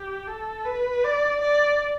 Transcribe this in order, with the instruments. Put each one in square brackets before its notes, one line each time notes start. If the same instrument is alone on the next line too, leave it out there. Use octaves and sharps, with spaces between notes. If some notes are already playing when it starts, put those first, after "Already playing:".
Already playing: [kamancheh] G4
A4
B4
D5
D5